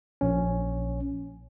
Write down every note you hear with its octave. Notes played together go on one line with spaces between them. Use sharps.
A#1 C#4